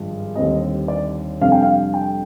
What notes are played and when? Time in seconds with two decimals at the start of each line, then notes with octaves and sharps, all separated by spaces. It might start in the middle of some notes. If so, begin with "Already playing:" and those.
Already playing: G#1 G2 F3 G#3
0.35 D#2 D3 G3 C4 D#5
0.88 D5
1.41 F2 C3 G3 D4 F5
1.52 G5
1.62 F5
1.94 G5